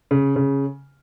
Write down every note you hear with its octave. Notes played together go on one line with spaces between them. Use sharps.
C#3
C#3